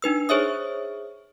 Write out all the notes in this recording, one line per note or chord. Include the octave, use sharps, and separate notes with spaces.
D4 D#4 B4 E6
G#4 C5 C#5 E5 D#6